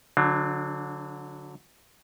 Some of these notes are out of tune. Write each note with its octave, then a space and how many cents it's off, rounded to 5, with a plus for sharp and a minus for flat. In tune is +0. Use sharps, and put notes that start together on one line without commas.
D3 -20 F#3 -25 D4 +35